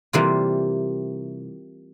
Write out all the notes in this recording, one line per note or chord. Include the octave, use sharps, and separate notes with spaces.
C3 E3 G3 A#3 F4